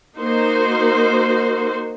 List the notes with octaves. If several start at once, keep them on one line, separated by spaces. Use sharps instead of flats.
A#3 D#4 F#4 C5